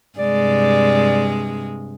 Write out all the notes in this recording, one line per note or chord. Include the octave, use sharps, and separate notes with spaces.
G2 C3 G#3 D5